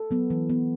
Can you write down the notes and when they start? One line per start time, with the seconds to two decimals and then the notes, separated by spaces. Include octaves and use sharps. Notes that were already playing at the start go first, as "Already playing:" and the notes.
Already playing: A4
0.11 F#3 B3
0.30 E3
0.49 B3